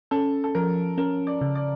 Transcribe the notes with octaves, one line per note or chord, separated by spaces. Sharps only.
C#4 A4
A4
F3 A#4
C#4 A#4
D5
C#3
D5